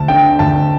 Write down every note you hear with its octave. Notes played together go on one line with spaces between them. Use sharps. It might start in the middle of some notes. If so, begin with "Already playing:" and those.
Already playing: D2 A5
D3 G5
D2 A5